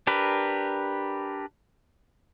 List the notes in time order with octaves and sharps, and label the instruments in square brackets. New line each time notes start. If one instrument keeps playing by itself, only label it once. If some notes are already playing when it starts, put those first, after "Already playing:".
[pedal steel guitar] D4 G4 A#4 B4